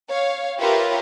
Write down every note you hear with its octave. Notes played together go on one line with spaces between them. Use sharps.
C#5 F5
F4 G4 A#4 B4 C#5 E5